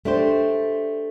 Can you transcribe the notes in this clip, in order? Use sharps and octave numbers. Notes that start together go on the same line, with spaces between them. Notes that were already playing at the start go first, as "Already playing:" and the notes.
A3 D4 G4 C5